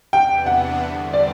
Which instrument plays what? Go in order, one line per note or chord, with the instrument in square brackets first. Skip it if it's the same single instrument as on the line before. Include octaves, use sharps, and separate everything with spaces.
[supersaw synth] E2 C3 E3 B3 D4 [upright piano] G5
[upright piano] F#5
[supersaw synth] E2 D3 G3 C4
[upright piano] D5